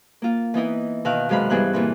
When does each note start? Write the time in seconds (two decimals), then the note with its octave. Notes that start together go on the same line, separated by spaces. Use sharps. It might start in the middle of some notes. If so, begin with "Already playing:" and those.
0.22 A#3 F4
0.54 E3 B3 D#4 E4
1.05 B2 D#3 E5 F5 F#6
1.29 F#2 C3 G#3 F5 B5 F#6
1.50 G2 E3 B3 G#4 F#6
1.73 A#2 E3 C4